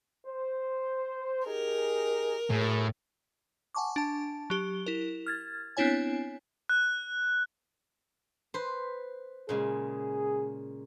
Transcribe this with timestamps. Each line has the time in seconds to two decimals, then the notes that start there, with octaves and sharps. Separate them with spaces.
0.26 C5
1.47 D#4 G4 G#4 A#4
2.50 A2 F#3 G#4
3.75 F#5 G#5 A5 C#6 D6
3.96 D4 A5
4.50 F#3 G4 G7
4.86 E4 A#4
5.26 F6 G#6 A6
5.77 B3 C4 D4 E4 C#5 G#5
6.69 F#6
8.54 B4 C5
9.49 A#2 C#3 G#3 G#4